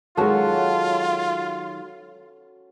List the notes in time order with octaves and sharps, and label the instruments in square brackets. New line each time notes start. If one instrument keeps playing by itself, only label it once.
[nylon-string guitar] D#3 F#3 G#3 [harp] C#4 F#4 A4 [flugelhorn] F4